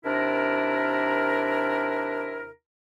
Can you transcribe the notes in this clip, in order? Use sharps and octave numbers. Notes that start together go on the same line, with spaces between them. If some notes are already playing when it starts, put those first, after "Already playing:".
D#2 C3 D4 E4 A#4